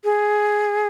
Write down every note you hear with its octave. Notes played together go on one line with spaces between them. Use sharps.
G#4